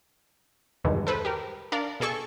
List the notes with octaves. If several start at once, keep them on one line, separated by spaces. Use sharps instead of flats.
E2 G2 B2 D#3 G#3
A4 B4 C5
G4 A#4
D4 A#4 D5 F5
B2 G#4 A4 C#6